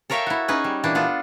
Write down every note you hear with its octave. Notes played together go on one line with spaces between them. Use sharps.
A4 A#4 C#5 E5 F5 G5
E4 F#4
C#4 D#4 G#4 B4
G3
A#2 E3 D4
B3 F4 A4